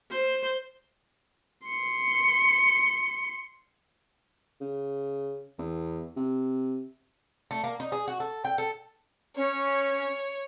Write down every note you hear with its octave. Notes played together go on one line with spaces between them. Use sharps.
C5
C6 C#7
C#3
E2
C3
A3
A#3
D#4
G#4
F#4
A4
G5
A4
C#4 C#5